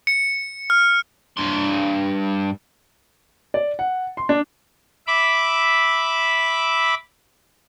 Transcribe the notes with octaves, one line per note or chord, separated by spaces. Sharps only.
C#7
F6
G2 C6
D5
F#5
C6
D4
E5 B5 D6